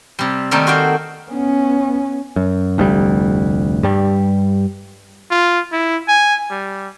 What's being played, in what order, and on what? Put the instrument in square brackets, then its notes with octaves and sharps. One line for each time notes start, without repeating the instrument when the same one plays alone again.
[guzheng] C3 G3
D#3 G3 A3 A#3 C4 D#4
F#4 C5 F5 G5
[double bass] B3 C#4
[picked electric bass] F#2
F1 D2 G3
G2 G3
[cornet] F4
E4
G#5
G3